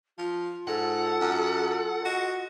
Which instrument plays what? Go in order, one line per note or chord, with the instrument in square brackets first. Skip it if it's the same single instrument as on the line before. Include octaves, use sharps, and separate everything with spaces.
[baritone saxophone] F3 [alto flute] F4
[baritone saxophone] G#2 [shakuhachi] A4 [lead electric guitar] F#5
[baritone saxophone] F#2
[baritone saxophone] F#4 [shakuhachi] D#5